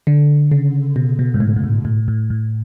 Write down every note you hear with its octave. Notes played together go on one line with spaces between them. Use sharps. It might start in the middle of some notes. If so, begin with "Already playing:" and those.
D3
C#3
B2
B2
G#2
A2
A2
G#2
A2
A2
A2